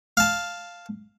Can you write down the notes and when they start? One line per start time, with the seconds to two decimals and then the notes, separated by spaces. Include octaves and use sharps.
0.17 F5 A5